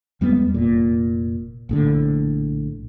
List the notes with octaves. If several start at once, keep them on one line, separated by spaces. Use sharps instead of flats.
E2 G3 G#3 B3
F1 A#2
A#1 A2 D3